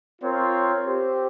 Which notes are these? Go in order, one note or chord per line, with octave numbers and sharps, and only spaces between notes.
C4 F4 A#4 C#5
C4 G4 C5